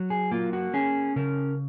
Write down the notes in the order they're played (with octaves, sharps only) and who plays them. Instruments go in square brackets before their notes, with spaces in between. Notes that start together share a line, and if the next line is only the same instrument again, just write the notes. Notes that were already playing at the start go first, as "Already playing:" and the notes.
Already playing: [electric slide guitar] F#3
G#4
A#3 F4
F#4
C#4 G#4
C#3 A#4